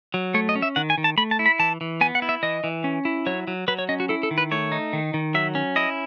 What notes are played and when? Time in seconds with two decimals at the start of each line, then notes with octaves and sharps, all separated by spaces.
0.14 F#3
0.34 A3 C#5
0.49 D#5
0.55 C#4
0.62 E5
0.76 D#3 F#5
0.90 G#5
0.98 D#3
1.04 A5
1.17 A3 B5
1.31 A5
1.39 E4
1.46 B5
1.59 E3 A5
1.81 E3
2.01 B3 G#5
2.15 F#5
2.22 E4
2.29 E5
2.43 E3 D#5
2.64 E3
2.84 C#4
3.05 E4
3.26 F#3 C#5
3.47 F#3
3.68 F#3 B4
3.79 C#5
3.89 C#4 D#5
4.00 F#4
4.09 E4 A4
4.23 A4
4.31 D#3
4.38 B4
4.51 A3 C#5
4.72 D#4
4.93 D#3
5.14 D#3
5.34 F#3 E5
5.55 C#4
5.76 E4 D#5